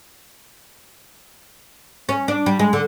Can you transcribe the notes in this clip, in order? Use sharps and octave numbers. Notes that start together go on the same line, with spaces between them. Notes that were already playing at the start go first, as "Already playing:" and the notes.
C#4
D4
G3
G#3
D3